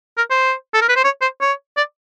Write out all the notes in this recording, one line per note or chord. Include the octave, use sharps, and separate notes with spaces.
A#4
C5
A4
A#4
B4
C5
C#5
C5
C#5
D5